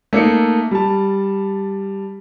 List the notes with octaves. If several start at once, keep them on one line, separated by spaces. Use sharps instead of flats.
A3 A#3 D#4 C#7
G3 A5